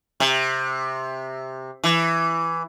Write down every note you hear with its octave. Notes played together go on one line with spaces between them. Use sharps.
C3
E3